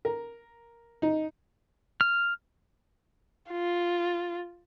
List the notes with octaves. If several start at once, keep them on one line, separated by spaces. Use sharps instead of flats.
A#4
D#4
F6
F4